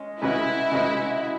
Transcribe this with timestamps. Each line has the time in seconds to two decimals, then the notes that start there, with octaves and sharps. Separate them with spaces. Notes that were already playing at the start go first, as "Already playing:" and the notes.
Already playing: G#3 C#4
0.21 C#3 G#3 C#4 E4 F#4 B4
0.71 C#3 G#3 C#4 F#4 B4